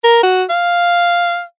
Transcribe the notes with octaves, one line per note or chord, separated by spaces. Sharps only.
A#4
F#4
F5